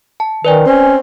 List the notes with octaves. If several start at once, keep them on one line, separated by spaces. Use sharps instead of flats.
A5
D#3 B4 D5 G#5
C4 C#4